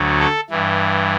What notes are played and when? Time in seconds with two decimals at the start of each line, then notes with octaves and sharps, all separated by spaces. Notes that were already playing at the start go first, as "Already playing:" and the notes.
Already playing: D2 D3 F#3
0.20 A4
0.50 G2 E3